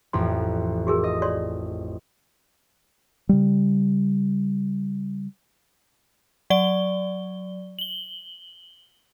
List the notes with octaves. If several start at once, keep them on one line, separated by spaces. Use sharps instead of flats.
A1 F2 C6
F#4 G#4 A#4
D#5
C#5 D5 C6
C#3 G3
F#3 D5 G7
F#7 G7